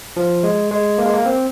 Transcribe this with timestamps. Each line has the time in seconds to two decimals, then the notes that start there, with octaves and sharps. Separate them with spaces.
0.16 F3
0.44 G#3
0.71 G#3
0.98 A#3
1.06 G#3
1.13 A#3
1.25 C4